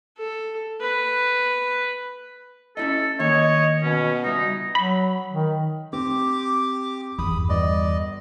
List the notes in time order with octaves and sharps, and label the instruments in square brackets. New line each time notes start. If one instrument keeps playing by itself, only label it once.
[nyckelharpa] A4
B4
[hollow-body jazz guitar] C#4 E4 D#5 [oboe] A4
[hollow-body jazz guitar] D#3 A#3 [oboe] C#5 [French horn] D#5
[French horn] B2 [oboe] C#4
[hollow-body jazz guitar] C#2 G3 E5 [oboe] D#4
[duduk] F#3 [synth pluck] B5
[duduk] D#3
[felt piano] C4 [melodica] G4 D6
[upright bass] E2 G2 [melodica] B5 D#6
[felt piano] G1 [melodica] D5 D#5